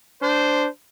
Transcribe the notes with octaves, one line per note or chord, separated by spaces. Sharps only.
D4 C5